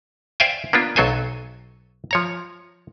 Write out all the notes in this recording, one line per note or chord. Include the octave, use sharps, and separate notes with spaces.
C5 D5 E5 F5 G5 G#5
A#3 B3 D4 F4
B1 F#3 A4 C5 G#5
F3 C#5 A#5